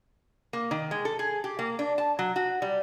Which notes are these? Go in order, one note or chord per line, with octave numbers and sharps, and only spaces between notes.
A#3
D#3
G#3
A4
G#4
G4
A#3
D4
A5
F#3
F#4
G3